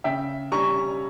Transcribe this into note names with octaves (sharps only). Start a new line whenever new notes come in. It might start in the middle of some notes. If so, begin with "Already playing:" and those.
C#3 E5 G5
G3 C#4 A#5 C#6